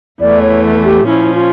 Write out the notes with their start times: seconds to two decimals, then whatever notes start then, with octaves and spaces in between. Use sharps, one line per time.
0.21 E2 E3 A3 D5
0.42 C#5
0.84 G4
1.06 A#2 F3 C#4 E4
1.34 F4